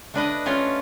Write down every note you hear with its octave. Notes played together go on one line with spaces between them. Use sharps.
A3 D4 B4 D#5
A3 C#4 F4